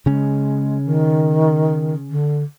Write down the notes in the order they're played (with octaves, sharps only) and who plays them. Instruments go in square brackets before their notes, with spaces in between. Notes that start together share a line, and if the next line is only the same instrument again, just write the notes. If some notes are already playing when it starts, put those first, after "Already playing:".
[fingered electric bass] C#3 C#4 [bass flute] G#3
[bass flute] D#3
D3